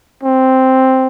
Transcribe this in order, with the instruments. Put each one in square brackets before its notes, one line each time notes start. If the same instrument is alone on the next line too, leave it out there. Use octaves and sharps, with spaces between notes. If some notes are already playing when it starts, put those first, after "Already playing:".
[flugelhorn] C4